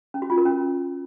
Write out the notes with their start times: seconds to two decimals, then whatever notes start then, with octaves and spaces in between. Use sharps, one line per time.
0.14 C#4
0.22 F#4
0.30 F4
0.38 A#4
0.45 C#4